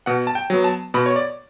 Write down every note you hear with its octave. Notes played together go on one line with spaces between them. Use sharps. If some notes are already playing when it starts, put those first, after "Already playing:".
B2 F#5
A5
G5
F#3 B3
A5
B2 B5
C#5
D5